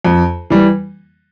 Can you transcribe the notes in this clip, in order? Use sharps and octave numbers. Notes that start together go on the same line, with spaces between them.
F2
E3 G3